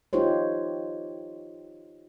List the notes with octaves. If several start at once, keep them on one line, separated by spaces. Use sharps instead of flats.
D#4 F4 G4 C5 C#5